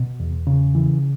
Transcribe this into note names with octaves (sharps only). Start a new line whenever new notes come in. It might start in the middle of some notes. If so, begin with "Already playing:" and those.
Already playing: B2
E2
C#3
E3